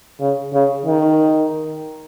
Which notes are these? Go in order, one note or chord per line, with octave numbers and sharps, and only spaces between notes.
C#3
C#3
D#3